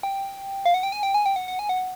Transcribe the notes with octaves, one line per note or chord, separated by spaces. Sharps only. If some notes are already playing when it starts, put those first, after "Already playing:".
G5
F5
F#5
G5
G#5
G5
G#5
G5
F#5
F#5
G#5
F#5